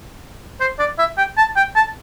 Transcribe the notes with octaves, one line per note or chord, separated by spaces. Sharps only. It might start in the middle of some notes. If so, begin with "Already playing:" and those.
C5
D5
E5
G5
A5
G5
A5